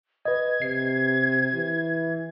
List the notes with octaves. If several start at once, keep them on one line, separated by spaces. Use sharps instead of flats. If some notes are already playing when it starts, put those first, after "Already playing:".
B4 D#5 G#6
C3 C7
E3